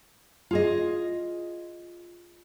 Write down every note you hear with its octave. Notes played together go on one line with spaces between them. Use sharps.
F4 G#4 D#5